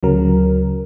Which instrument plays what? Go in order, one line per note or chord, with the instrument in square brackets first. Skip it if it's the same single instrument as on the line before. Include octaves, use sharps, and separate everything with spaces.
[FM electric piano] D2 C#3 F#3 A#4